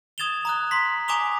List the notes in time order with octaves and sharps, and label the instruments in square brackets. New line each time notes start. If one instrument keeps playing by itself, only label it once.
[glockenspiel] D#6 G#6 A6 E7 F7 G7
A#5 D#6 F#6
C6 B6
G#5 A#5 D6 D#6 F7 G7